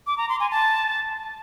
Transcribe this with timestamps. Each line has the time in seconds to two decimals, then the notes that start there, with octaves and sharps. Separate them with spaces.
0.07 D6
0.18 A#5
0.29 C6
0.40 G#5
0.51 A5